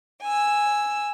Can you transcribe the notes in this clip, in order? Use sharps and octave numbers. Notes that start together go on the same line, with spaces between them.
G#5 E6